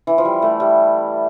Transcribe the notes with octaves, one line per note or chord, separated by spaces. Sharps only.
E3
F3
G3
A3
G3